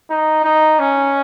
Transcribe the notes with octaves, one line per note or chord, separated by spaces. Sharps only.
D#4
D#4
C#4